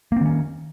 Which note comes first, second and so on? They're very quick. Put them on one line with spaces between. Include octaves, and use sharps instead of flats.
A#3 C4 D#3 C#4